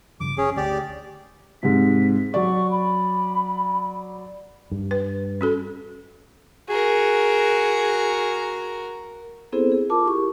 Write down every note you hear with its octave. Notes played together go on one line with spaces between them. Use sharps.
G2 C#3 F3 D6
G1 C#4 G#4
D2 G4 D5
G#2 C3 B6
F#3 D5 C#6
B5
G2
B4
C#4 F#4 A4
F#4 G#4 A#4
B3 C4 E4 G#4 A4 C5
G#4
F4 A#4 A5 D6
E4 G4 C#6